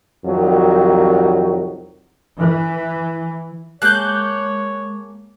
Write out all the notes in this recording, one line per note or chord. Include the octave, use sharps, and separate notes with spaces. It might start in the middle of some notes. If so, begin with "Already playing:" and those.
C2 F2 D#3 F#3
E3
G#3 A#3 G#4 C#5 A5 F#6 G6